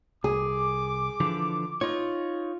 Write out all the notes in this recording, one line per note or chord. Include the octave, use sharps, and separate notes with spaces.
C2 G#4 D6
D3 E3 F3
D#4 F4 C#5